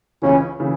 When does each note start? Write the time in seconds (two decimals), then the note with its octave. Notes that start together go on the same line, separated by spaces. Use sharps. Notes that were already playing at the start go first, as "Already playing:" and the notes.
0.22 C#2 C#3 E3 C#4
0.60 C#3 E3